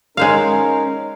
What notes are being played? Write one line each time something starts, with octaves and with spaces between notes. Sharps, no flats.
G#3 C#4 D#4 A#4 C5 F5